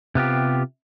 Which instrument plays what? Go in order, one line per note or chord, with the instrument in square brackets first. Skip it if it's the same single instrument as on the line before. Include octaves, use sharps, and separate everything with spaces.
[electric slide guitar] C3 B3 F4 G4